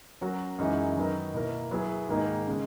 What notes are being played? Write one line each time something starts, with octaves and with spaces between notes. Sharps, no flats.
F#3 C#4 F#4 A#4
F#2 E3 G#3 D#4 F#4
D#3 F#3 B3 D#4 A#4
B2 A#3 E4 A#4
F#3 B3 E4 G#4
G#2 D#3 A#3 D#4 G#4
C#3 G#3